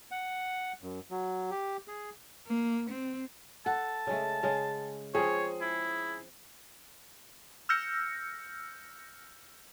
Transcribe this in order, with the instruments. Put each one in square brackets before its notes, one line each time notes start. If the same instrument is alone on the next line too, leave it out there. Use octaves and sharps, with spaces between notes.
[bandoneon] F#5
F#2
F#3
G4
G#4
[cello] A#3
C4
[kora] A4 [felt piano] F#5 [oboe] A5
[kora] C#3 G#3 A3
C#3 G#3 F5
[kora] F3 C4 C#4 [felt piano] G#4 [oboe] C#5
[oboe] E4
[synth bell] E6 F6 G6 A#6 C#7